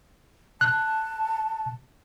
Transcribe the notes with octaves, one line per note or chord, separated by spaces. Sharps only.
A5 F#6